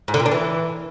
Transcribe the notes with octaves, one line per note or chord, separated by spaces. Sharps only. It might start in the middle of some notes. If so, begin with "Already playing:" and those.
G#2
D3
A#2
D4
E3